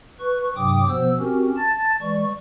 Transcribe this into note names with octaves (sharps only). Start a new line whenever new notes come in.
B4 C#6
G2 C3 F#3 G5 D6 D#6
B2 F3 B3 C5 E6
C4 C#4 F#4 G4 A#4
A5 A6
E3 G#3 D5 C#6